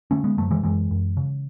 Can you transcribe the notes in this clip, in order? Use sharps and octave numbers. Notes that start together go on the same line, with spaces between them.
D3 A3 C#4
G#3 B3
F#2 F#3 A3
E3 G#3
F#2 E3 G#3
F#2
C#3